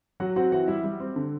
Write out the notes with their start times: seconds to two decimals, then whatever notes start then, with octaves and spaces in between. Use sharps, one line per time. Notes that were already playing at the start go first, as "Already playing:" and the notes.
0.20 F#3 F#4 F#5
0.36 C4 F#4 F#5
0.52 E3 F#4 F#5
0.68 G3 E4 E5
0.84 G3
1.00 C4
1.16 D3